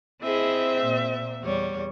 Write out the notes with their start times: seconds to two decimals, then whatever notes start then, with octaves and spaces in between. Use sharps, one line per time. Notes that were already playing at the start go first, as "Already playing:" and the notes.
0.22 C4 E4 G#4 D#5 E5
0.81 A#2
1.41 E2 G3 C#5